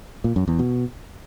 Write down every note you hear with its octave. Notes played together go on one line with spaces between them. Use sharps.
A#2
F#2
E2
B2